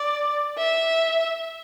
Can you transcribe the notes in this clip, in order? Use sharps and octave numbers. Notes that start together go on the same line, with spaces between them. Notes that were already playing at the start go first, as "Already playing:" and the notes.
Already playing: D5
E5